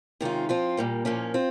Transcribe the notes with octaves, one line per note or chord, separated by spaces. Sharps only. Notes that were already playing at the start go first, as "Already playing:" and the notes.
C3 D#3 G#3 C#4 F4
F3 C4 F4
A#2 G3 A#3
A#2 F3 A#3 C#4
C4 F4